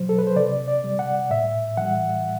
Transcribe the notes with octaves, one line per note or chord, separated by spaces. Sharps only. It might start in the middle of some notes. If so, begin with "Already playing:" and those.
Already playing: B2 F#3 C5
A4
B4
C5
C3 D5
D5
G3
F#5
A2 E5
E3 G3 F#5